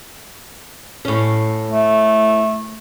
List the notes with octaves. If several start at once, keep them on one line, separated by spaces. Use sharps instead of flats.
A2 C#4
A3